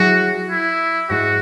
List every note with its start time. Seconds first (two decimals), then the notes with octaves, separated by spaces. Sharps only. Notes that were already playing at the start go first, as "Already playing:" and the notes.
Already playing: F#3 E4 F#4 G#4
0.50 E4
1.10 G#2 G#3 E4 F#4